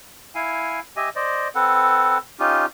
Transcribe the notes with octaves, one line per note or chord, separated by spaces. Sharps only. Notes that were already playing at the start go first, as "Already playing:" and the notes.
E4 F5 G#5
G4 D#5 E5 G#5
C5 D5 D#5
C4 A4 B4 F#5
C#4 D#4 F4 G4